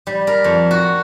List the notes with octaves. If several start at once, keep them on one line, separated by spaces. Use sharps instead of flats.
G3
A#4
F2
F#4